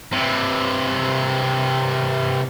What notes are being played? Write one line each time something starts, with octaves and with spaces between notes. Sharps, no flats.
C3 E3